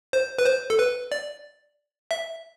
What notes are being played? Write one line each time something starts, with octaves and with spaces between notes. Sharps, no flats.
C5
B4
C5
A4
B4
D5
E5